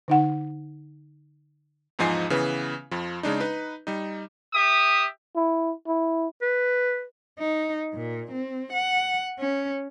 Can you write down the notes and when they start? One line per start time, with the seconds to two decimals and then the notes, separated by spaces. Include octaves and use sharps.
0.08 D3 D#4 F#5
1.99 E2 G#2 F3 D#4 G#5 C7
2.30 C#3 E3 B3 B4
2.91 F2 F3
3.23 C#3 G#3 D4 D#4
3.40 D#4 B4
3.87 G3 D#4
4.54 G4 E5 D#6
5.36 E4
5.87 E4
6.42 B4
7.39 D#4
7.94 A#2
8.32 C4
8.73 F#5
9.39 C#4